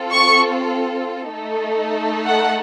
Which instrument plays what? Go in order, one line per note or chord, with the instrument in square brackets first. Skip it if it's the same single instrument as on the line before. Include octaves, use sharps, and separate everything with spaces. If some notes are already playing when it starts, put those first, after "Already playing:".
Already playing: [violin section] C4 F4 A4
C#6
A3 D#4 A4
F#5